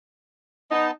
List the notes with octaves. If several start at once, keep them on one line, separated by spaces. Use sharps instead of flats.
B3 D#4 D#5 A5